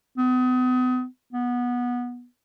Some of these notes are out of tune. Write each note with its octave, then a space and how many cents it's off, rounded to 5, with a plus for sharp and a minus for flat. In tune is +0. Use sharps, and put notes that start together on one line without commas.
B3 +40
B3 -15